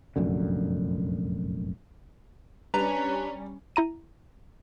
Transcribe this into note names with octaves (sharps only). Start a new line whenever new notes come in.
F1 A#1 F#2 D3
G3 C#4 D4 B4 A#5
E4 A#5 D#7